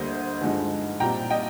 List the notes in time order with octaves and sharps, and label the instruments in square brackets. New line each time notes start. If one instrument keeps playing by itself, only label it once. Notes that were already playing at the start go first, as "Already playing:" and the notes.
Already playing: [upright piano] D2 D3 G3 A#3 C5 D#5
G2 D3 F3 G#3 D#4
A#2 G3 C4 D#4 G5 A#5
D#5 G5